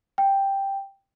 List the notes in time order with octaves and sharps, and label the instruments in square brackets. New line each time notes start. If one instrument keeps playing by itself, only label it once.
[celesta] G5